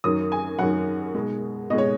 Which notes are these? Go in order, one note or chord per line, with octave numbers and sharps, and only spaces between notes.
F#2 D#3 F#3 D#6
G#5
F#2 D#3 F#3 F#5
B2 G#3
B2 G#3 D#5
C#5